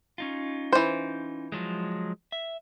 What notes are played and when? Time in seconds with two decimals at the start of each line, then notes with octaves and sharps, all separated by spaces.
0.18 C#4 D#4 F4
0.72 E3 C5
1.52 F3 F#3 G#3
2.32 E5